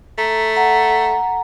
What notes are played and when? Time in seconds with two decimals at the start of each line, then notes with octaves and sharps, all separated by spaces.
0.18 A3 A#5
0.56 F#5 A#5